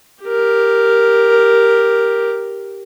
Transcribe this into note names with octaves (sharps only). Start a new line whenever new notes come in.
G4 A#4